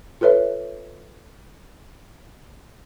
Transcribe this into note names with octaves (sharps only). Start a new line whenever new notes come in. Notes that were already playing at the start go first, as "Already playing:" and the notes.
F4 A4 B4 C#5 E5